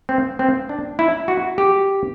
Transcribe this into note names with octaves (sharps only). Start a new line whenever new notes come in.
C4
C4
D4
E4
F#4
G4